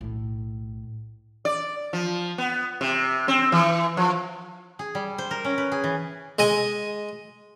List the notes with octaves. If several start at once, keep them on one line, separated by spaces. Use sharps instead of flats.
B1 A2
D5
F3
B3
C3
C4
E3
F3
G#4
G3
C5
A#4
C#4
B4
G#4
E3
G#3 D#5 G#5